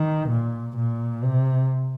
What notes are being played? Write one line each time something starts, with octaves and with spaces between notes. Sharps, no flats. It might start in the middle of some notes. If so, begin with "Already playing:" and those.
Already playing: D#3
A#2
A#2
C3